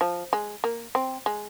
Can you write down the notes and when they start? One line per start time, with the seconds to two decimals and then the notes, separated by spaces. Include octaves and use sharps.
0.01 F3
0.33 G#3
0.64 A#3
0.95 C4
1.26 G#3